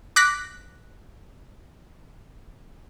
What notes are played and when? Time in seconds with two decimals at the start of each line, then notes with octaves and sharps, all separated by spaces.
0.16 D6 F#6 A#6 B6